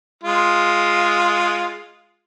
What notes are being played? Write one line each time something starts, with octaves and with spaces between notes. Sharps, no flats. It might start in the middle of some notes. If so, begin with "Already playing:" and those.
G#3 F4